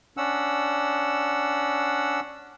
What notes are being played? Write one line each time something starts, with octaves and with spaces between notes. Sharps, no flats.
C#4 D4 F#5 E6